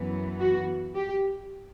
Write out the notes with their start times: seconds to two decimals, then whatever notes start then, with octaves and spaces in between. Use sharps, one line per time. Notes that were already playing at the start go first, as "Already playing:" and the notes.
Already playing: F#2 E3 B3
0.40 F#4
0.95 G4